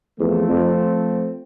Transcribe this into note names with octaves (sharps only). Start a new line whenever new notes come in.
E2 F3 A3 C4
F2